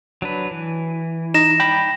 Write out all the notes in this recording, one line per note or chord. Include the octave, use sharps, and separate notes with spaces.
F#3 D4 B4
E3
D#4 A#6 E7
G5 B5